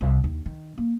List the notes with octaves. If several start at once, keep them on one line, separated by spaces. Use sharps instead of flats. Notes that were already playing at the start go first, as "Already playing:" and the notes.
C2
D#2
D#3
A#3